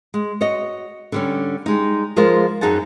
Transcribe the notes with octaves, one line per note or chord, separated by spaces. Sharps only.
G#3
F#4 C#5 D#5
D3 G3 C#4
G3 G#3 D#4
F3 G#3 F4 G#4 A#4 C5
F#2 C#4 D#4 G#4 F#5 A5